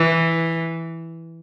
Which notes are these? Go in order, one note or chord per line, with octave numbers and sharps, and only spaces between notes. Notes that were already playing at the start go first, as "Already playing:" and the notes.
Already playing: E3